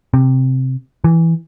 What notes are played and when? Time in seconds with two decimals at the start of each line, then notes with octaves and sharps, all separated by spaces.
0.14 C3
1.04 E3